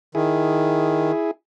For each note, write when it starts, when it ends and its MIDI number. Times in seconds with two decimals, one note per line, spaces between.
0.15 1.12 51
0.15 1.31 64
0.15 1.31 68